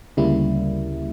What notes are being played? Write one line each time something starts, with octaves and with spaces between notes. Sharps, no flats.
D2 C#3 G3 A#3 E4